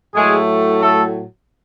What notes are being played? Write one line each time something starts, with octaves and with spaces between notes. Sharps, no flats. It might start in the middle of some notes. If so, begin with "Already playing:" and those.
A2 F#3 G#3 A3 G#4
A3 A4